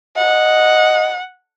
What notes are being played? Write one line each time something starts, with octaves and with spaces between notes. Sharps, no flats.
D#5 F#5